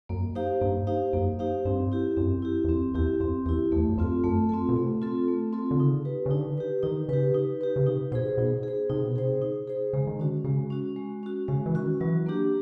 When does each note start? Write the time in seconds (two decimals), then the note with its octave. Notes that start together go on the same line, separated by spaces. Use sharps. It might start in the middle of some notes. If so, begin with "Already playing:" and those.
0.09 F#2 A#3
0.35 D#4 G4 C5 F5
0.61 G2 A#3
0.87 D#4 G4 C5 F5
1.13 F#2 A#3
1.39 D#4 G4 C5 F5
1.65 G2 C4
1.92 E4 G4
2.17 F#2 C4
2.42 E4 G4
2.64 E2
2.69 F2 C4
2.95 E2 E4 G4
3.20 F2 C4
3.46 E2 E4 G4
3.72 E2 A3
3.89 F#2
3.97 F2 C4 F4 A4
4.24 F#2 A3
4.49 C4 F4 A4
4.69 B2
4.76 C3 A3
5.02 C4 F4 A4
5.28 A3
5.53 C4 F4 A4
5.71 D3
5.79 C#3 D#4
6.05 G4 B4
6.26 C#3
6.31 D3 D#4
6.57 G4 B4
6.83 D#3 D#4
7.09 C#3 G4 B4
7.34 D#4
7.61 G4 B4
7.76 C#3
7.86 C3 D#4
8.12 B2 G#4 C5
8.38 B2 D#4
8.63 G#4 C5
8.90 C3 D#4
9.04 B2
9.16 C3 G#4 C5
9.42 D#4
9.67 G#4 C5
9.93 C#3 G#3
10.07 D#3
10.19 D3 C#4 F#4
10.44 C#3 G#3
10.70 C#4 F#4
10.96 G#3
11.23 C#4 F#4
11.48 C#3 G#3
11.66 E3
11.75 D#3 C#4 F#4
12.01 E3 F#3
12.26 A#3 D4 G4